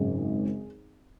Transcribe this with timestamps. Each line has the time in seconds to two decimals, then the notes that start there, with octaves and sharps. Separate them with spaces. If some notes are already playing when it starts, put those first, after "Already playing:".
Already playing: G#1 F#2 C#3 G#4